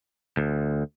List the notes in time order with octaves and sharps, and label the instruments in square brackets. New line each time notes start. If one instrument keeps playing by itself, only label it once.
[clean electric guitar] D2